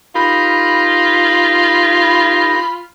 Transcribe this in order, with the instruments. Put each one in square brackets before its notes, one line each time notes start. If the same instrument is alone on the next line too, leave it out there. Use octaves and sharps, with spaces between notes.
[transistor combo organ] D#4 G4 A#4 [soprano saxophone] F4 [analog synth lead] B5